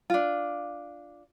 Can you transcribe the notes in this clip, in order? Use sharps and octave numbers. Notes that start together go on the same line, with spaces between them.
D4 F4